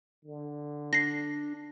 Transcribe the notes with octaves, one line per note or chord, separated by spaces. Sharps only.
D3
D4 A#6 C7